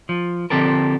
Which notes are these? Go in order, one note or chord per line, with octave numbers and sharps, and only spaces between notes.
F3
D3 F3 C4 G4 A4 A#4